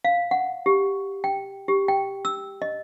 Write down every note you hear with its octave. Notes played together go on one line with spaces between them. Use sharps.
F5
F#5
G4
G5
G4
G5
E6
D#5